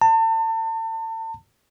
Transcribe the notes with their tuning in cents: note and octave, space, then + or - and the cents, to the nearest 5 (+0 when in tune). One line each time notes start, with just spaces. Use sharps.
A5 +35